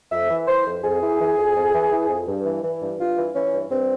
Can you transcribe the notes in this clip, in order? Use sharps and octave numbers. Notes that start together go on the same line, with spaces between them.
F2 E5
E3
E3 C5
F2
F2 G#4
E3
E3
F2
F2
E3
E3
F2
G2
E3
E3
G2
G2 F4
E3
E3 C#4
G2
G2 C4